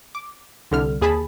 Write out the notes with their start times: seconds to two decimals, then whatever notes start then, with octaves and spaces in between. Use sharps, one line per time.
0.15 D6
0.71 C2 D3 F6
1.01 D#2 G#4 A5 B5